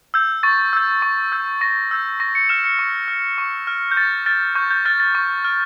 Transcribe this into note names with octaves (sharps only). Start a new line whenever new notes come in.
E6 G6
C#6 A6
E6 G6
C#6
E6 G6
C#6 A#6
E6 G6
C#6 A#6
C#7
F6 E7
C#7
C#6
F6
C#6
F6
G6
C#6 A6
F6 A6
C#6 G6
G6
F6 A6
A6
C#6
F6